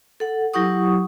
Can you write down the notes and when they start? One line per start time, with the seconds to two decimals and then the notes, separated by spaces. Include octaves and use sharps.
0.20 A4 F#5
0.54 F#3 E4 G4 F#5 C#6 D#6